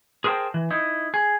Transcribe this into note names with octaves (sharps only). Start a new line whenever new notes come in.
G#4 A#4 C5 C#5 G5 A5
E3
D#4 E4
G#4